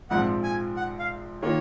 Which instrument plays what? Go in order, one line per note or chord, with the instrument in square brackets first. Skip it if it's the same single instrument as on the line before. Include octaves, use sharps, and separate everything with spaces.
[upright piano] A#1 G#2 F3 C4 [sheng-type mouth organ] F#5
[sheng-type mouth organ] G#5
F#5
F5
[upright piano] D#3 A#3 F4 [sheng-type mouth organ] C#5